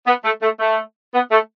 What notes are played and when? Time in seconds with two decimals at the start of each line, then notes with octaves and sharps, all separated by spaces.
0.06 B3
0.24 A3
0.42 A3
0.60 A3
1.14 B3
1.31 A3